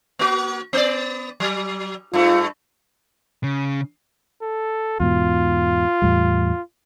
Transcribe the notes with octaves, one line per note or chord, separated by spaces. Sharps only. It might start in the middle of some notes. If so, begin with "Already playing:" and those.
A#3 F#4
B3 D5
F#3
G2 A3 F4
C#3
A4
E2 G#2 B2 F4
E2 A2 G3